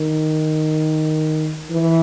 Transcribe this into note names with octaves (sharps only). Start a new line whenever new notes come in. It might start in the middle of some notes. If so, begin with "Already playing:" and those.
Already playing: D#3
E3